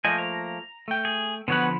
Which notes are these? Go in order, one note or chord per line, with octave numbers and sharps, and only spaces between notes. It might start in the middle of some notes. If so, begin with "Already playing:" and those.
F3 A3 A#3 C5 D#5 G#5
A#5
A3 G5
G#4
D3 F3 B3 C#5 F#5 B5